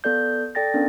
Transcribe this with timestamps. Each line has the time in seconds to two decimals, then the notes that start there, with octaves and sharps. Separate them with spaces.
0.04 B3 A4 D5 G6
0.55 A4 D5 G5 A6 A#6
0.74 B3 C#4 D4 A#4